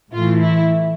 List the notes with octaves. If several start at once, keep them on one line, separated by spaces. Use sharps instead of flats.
A2 E3 A3 F4
E4